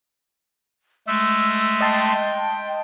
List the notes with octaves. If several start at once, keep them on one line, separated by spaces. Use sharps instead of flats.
G#3 A3 E6
D#5 G5 A5 C6